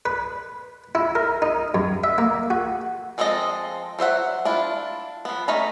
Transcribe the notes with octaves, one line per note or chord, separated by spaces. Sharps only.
B4
E4
A#4
D#4
F#2
E5
A#3
F#4
F3 G#3 C4 A4 D#5
F#3 C5 E5 F#5
D4 E4 F4
F3 B3
A3 C#4 D#4 A#5 B5